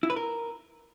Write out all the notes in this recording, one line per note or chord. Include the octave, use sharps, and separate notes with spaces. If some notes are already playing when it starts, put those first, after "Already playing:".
E4
B4
A#4